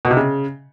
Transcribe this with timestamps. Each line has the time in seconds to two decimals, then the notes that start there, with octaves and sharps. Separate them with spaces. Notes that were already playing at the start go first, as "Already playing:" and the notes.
0.05 B2
0.11 C3
0.17 C#3